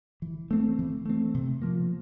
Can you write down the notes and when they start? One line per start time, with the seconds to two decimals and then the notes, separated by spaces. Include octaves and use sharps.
0.22 E3
0.51 A3 C4
0.79 E3
1.06 A3 C4
1.34 C3
1.62 F3 A#3